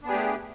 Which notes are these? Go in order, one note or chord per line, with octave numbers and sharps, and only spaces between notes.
A3 B3 D4 G4 G#4